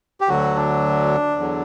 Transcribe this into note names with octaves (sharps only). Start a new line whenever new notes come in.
G4
D2 D3 F#3 F#4
D4
E2 D3 F#3